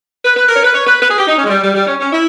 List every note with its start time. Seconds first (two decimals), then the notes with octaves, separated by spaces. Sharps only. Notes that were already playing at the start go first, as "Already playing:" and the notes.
0.24 B4
0.36 B4
0.49 A#4
0.55 C#5
0.62 B4
0.74 C#5
0.86 B4
1.00 B4
1.09 G#4
1.18 G4
1.27 D#4
1.37 C#4
1.43 G#3
1.49 G3
1.62 G3
1.74 G3
1.87 C#4
1.99 C#4
2.13 E4